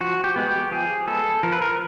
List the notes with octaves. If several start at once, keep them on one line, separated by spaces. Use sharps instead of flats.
F3 F#4
G4
G#3 B3
G4
F3 G#4
G#3 B3 A4
F3 A#4
B4
A#4